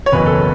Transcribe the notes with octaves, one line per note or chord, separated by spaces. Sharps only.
C#5
F#1 E2 B2 F#3 B4
A4